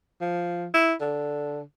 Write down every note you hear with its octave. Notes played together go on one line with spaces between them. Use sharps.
F3
E4
D3